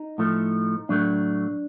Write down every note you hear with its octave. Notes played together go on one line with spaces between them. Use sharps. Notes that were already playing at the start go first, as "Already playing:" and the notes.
Already playing: D#4
A2 F3 A3
A2 F#3 A3 D4